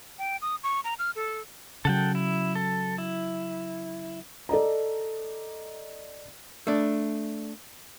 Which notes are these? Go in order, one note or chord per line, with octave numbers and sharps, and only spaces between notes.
G5
D#6
C#6
A#5
F6
A4
C#3 F#3 A4 F#5 G5
E4
A4
E4
A4 D5 D#5 A#5
A3 D4